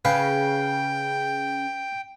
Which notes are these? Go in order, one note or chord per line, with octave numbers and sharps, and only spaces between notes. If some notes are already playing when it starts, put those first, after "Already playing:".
C#3 B4 F5 G5